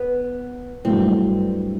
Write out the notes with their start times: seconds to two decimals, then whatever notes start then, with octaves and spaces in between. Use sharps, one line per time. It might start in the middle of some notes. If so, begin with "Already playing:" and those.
Already playing: B3
0.84 G2 F#3 A3 C4 E4